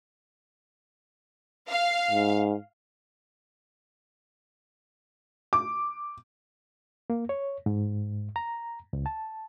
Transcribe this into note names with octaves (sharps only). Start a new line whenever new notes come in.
F5
G#2
D6
A#3
C#5
G#2
A#5
C#2
A5